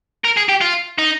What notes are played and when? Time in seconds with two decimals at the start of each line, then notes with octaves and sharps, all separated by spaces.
0.24 A#4
0.37 G#4
0.49 G4
0.61 F4
0.98 D#4